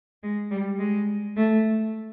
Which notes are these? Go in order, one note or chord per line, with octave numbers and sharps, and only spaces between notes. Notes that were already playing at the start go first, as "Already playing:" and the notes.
G#3
G3
G#3
A3